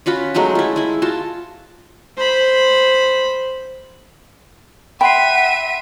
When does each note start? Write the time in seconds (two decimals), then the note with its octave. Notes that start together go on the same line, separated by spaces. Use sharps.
0.06 C#4 F4 F#4 B5
0.34 F#3 G#3 A3 D#4
0.55 E4 F4
0.76 G#3 E4
1.02 F4 F#4 A5
2.17 C5 B5
5.01 E5 F#5 G5 B5 C6 C7 D#7